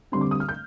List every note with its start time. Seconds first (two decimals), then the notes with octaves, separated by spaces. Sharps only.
0.12 D3 G3 C4 C6
0.21 D6
0.31 D#6
0.40 F6
0.49 G6